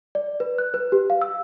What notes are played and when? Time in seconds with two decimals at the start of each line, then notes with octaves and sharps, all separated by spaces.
0.15 D5
0.40 B4
0.58 F#6
0.74 B4
0.92 G4
1.10 F5
1.22 E6